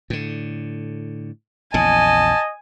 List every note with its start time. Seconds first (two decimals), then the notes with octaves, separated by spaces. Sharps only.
0.10 A2 D3
1.74 A#1 E2 C#3 D#5 G#5 A5